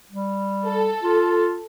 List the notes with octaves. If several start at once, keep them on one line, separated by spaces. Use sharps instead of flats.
G3
A4
F4